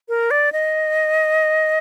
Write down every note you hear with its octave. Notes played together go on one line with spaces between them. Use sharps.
A#4
D5
D#5